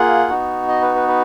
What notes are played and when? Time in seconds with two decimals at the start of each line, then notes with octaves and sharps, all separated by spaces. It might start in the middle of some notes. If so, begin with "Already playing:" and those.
Already playing: A#3 F4 G#4 F#5
0.29 B3 D#4 F#4
0.68 D#5
0.81 B4
0.95 B4
1.08 B4